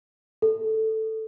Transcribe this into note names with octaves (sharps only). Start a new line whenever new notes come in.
A4